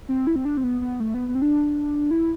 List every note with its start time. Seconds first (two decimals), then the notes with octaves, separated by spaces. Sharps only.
0.09 C4
0.27 E4
0.36 C4
0.45 D4
0.57 C4
0.64 B3
0.81 B3
1.00 A3
1.14 B3
1.28 B3
1.35 C4
1.42 D4
2.11 E4